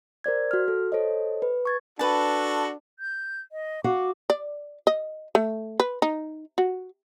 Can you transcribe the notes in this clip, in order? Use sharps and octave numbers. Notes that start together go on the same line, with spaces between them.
A#4 C5 D5 G#6
F#4 F6
A4
A4 C5 C#5 D#5
B4
C#6 G#6 A6
D4 F#4 A4 B4 A5
G6
D#5
F#4 F5 F#5 D6
D5
D#5
A3
B4
D#4
F#4